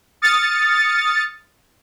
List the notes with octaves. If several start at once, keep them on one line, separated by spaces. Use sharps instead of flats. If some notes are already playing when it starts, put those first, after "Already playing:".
D#6 F6 A6 C#7